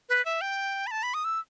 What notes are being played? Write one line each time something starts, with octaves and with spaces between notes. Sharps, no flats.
B4
E5
G5
B5
A5
B5
D#6
E6